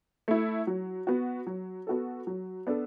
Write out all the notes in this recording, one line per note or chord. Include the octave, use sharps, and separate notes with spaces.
A3 E4
F#3
B3 F#4
F#3
B3 F#4 A4
F#3
B3 D4 A4